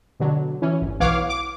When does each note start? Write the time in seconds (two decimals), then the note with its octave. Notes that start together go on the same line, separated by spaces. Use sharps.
0.20 B2 D3 F#3
0.62 E3 C#4
0.82 G1
1.00 B1 E3 C#5 F5 F#5 D6
1.29 D6